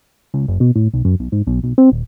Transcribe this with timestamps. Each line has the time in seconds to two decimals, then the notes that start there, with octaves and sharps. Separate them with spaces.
0.34 C#2
0.48 F#1
0.60 B2
0.76 A2
0.94 B1
1.05 F#2
1.19 B1
1.32 G#2
1.47 B1
1.63 B1
1.78 C4
1.91 D#1